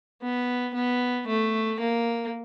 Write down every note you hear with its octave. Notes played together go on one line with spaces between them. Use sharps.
B3
B3
A3
A#3